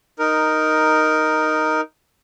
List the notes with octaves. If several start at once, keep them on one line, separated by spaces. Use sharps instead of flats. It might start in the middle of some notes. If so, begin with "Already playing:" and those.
D#4 A#4